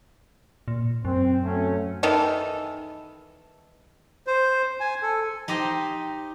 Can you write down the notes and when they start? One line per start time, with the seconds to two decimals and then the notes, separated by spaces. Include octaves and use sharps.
0.68 A#2
1.05 F#2 C4
1.43 F#3 A3 C#4
2.03 D#3 E3 D#4 A4
4.27 C5
4.80 G#5
5.02 A4
5.48 D#4 G4 C5 D#5 G5